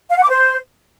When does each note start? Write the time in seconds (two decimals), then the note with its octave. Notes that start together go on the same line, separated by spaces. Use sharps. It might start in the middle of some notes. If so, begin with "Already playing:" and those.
0.10 F5
0.17 F#5
0.23 D6
0.29 C5